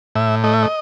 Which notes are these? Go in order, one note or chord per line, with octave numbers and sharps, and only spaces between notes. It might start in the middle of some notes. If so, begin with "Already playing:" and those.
A2 E5
A3 D#5
E5
D#5